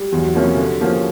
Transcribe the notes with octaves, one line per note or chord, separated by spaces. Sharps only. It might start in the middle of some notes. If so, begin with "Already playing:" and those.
Already playing: G3
E2 F#3
C3 F3 A#3 C#4
D3
F3 A#3 C#4